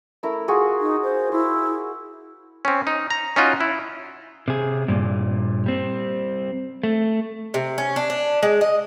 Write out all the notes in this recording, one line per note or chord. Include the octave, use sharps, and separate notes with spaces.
A3 E4 A#4
F4 F#4 G#4
D#4
C5
E4 C6
C4 C#4
D#4
A#5
C#4 D#4 F4 F#4
E4
C3 G#4
G2 A#2
G3 C4
A3
C3
C#4
D4
D4
G#3
D#5